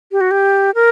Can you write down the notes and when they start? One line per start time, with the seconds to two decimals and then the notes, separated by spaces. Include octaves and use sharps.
0.12 G4
0.21 F#4
0.31 G4
0.75 A#4